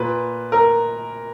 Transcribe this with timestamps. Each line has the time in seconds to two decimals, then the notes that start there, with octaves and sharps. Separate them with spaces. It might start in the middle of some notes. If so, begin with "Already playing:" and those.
Already playing: A#2 B4
0.52 A#4